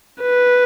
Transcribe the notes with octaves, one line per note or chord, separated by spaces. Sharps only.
B4